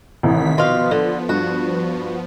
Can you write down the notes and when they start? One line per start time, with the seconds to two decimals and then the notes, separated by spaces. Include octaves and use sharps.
0.23 A1 C3 D#3 E3 B6
0.58 B2 F3 B3 F5 C6
0.91 D3
1.29 G2 F#4